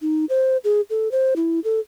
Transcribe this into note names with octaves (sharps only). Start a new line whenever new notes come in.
D#4
C5
G#4
A4
C5
E4
A4